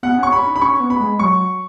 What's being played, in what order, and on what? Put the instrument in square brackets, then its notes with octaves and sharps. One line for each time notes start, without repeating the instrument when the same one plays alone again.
[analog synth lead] B3 [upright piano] F#5
[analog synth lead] C#4 [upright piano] C#6
[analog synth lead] C#4 [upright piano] B5
[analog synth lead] D#4
[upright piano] B5
[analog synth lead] C#4 [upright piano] C#6
[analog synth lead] B3
[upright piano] B5
[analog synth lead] G#3
[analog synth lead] F#3 [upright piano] C#6